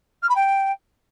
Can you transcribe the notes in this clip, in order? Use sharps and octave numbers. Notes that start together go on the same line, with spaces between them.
F6
B5
G5